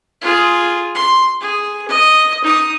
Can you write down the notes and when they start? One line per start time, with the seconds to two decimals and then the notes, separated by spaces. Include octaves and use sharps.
0.21 F4 G#4
0.95 C6
1.41 G#4
1.88 D#5
2.44 D#4 D#6